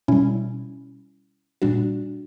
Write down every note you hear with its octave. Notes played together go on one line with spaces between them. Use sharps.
B2 G3 C#4 E4
A#2 G3 D4 F#4